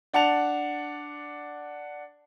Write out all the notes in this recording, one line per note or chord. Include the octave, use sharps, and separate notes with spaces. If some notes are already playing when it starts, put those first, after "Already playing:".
D4 F#5 A5 F7